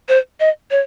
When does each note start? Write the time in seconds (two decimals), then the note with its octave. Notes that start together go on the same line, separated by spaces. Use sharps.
0.08 C5
0.40 D#5
0.71 C#5